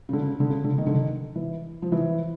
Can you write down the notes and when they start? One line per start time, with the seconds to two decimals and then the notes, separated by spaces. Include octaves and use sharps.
0.09 C#3
0.13 D3
0.22 C#3
0.40 D3
0.50 C#3
0.64 D3
0.78 D#3
0.86 D3
0.93 D#3
1.35 E3
1.82 F3
1.92 E3